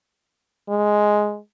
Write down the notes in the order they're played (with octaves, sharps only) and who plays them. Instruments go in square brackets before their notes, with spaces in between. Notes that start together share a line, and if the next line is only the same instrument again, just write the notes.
[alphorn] G#3